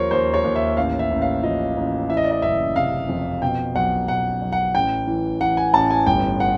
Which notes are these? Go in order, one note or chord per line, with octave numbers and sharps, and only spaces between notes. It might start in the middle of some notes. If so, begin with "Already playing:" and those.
Already playing: D#2 F3 A#4 C5 C#5
D#2 C5
C#5
D#2
E5
A1 F5
E5
A1
F5
F3 D#5
A1
E3 E5
D#5
D5
D#5
F#1 E5
C3 F5
F2
B2 G5
B1 F#5
B1 F#5
B1
F#5
A1 G5
E3
E3 F#5
G#5
A1 A5
G#5
G1 G5
F#5